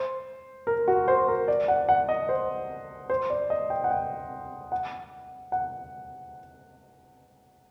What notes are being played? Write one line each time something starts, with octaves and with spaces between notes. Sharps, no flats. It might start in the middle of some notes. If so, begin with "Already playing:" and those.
Already playing: C5
A#4
F#4
C5
A#4
D5
F#5
F#5
D#5
C5
C5
D5
D#5
G5
F#5
G5
F#5
F#5